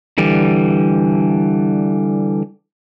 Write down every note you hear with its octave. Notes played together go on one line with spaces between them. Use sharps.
D3 E3 G3